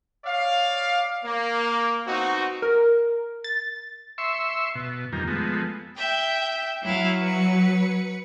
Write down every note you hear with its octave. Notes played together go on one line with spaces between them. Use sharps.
C#5 D5 F5
A#3
B2 C4 D#4 F#4
A#4
A6
E5 C6 C#6 E6
B2
F2 D#3 G3 A#3
F3 G#3 A3 B3
E5 G5 G6
F#3 E4 F5
B4 C#7